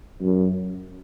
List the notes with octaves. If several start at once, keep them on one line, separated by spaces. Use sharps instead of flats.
F#2